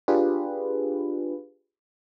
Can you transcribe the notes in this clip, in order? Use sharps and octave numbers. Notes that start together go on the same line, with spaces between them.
D4 F4 G4 G#4 B4